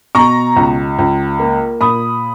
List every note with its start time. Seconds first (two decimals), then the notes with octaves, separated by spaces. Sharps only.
0.15 B2 A#5 C#6
0.56 C#2
0.98 C#2
1.39 A#3
1.81 A#2 B5 D#6